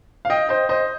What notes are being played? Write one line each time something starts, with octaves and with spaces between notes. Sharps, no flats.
F5
D#5 G5
C5 D#5
C5 D#5